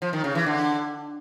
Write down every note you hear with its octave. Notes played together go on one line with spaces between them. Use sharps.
F3
D#3
C#3
E3
D3